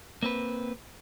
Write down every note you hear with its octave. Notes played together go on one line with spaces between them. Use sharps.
A#3 C4 B4